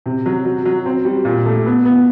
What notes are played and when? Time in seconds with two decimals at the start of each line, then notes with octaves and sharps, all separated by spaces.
0.06 C3
0.26 F#3
0.45 F#3
0.65 F#3
0.86 C4
1.05 G3
1.25 A#2
1.46 A3
1.66 B3
1.85 B3